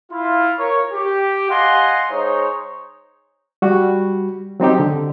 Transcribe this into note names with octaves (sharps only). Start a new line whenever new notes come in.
E4 F4
A#4 C#5
G4
D#5 F5 F#5 G#5 C6
G#3 D#4 C5 C#5
G3 F#4
F#3 C4 D#4 G4
D3